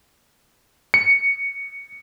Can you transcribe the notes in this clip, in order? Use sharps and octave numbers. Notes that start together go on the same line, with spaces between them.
C#7